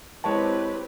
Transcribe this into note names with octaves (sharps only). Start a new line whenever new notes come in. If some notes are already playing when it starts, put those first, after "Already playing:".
G#3 C4 E4 G4 B4 C#5 A5